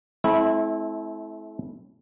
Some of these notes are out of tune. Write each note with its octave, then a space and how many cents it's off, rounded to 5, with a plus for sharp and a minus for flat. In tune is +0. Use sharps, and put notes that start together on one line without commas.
A3 -40 C4 +10 E4 -15